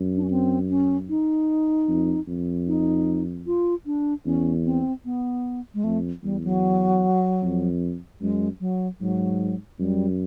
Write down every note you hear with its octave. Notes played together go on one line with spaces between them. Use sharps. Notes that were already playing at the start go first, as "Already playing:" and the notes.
Already playing: F#2
D4
C#4
C4
C#4
D#4
F2
F2
D#4
F4
D4
E2 C#4
C4
B3
G#3
F2 A3
E2 G3
F#3
F2
F#2 G#3
F#3
G#2 F#3
F#2 G3